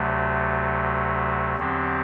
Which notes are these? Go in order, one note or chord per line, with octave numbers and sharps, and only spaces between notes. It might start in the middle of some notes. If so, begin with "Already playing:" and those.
Already playing: D2 C3 F#3 A3
E2 D3 F#3 C4 G4